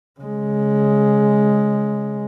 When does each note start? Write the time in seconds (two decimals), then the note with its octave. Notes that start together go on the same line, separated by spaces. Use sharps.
0.20 C#3 G#3